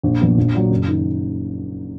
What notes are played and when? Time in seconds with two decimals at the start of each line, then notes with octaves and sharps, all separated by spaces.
0.03 A#1
0.21 A#2 F3 B3
0.38 A#1
0.54 A#2 F#3
0.70 F#1
0.88 D#3